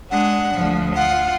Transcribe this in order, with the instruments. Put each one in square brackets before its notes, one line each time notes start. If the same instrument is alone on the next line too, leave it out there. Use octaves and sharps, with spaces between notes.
[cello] G#3 D4 [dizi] F#5
[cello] D2 F3
[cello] F4 [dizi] F#5